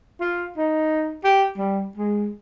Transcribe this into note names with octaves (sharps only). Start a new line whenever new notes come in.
F4
D#4
G4
G3
G#3